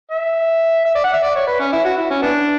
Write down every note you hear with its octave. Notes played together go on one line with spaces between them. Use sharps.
E5
E5
D5
F#5
E5
D5
C#5
B4
C#4
E4
F#4
E4
C#4
B3 D4